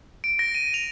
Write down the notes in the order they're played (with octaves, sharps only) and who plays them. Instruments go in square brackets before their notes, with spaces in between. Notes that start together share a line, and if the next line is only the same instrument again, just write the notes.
[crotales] D7
A#6
D#7
F7